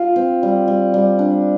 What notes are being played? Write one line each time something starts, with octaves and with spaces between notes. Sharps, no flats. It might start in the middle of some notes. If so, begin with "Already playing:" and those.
Already playing: F4
C4
G3
G3
G3
D4